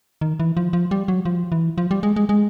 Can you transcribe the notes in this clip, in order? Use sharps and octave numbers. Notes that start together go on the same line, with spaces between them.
D#3
E3
F3
F3
G3
F#3
F3
E3
F3
G3
G#3
G#3
G#3